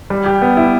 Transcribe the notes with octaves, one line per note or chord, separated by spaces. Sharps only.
G3
G4
B3
E4